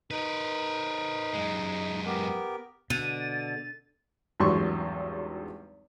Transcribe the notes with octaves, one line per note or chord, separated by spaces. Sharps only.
D#4 A#4 B4
F#2 G#3
B3 G4 A#4
B2 D3 A6 D#7
G#1 E2 G2 F#3 C6 C#6